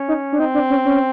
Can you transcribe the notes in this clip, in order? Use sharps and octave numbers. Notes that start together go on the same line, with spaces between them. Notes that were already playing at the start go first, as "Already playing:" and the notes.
Already playing: C#4
D#4
D4
C4 D#4
D4
C#4
C#4